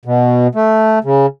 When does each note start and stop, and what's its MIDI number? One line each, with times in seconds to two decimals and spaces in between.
0.05 0.47 47
0.55 0.99 57
1.04 1.26 49